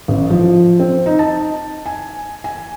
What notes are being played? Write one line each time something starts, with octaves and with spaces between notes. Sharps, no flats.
A1
F3
C4
D#4
A5
G#5
G#5